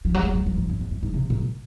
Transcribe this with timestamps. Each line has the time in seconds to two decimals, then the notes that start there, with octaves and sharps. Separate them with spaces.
0.05 F3
0.14 F#3
0.23 G#3
0.35 F#3
0.46 F3
0.57 G#2
0.69 F#2
0.81 F2
0.91 F#2
1.03 G#2
1.14 C3
1.30 A#2